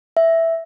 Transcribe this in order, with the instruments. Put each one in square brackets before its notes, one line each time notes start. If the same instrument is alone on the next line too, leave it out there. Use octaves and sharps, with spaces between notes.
[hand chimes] E5